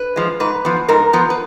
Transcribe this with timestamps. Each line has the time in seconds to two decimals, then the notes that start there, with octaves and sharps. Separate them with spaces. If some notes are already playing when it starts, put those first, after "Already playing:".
Already playing: B4
0.16 F3 G#3
0.40 G#2 B4
0.65 F3 B3
0.89 G#2 A#4
1.13 F3 B3
1.30 B4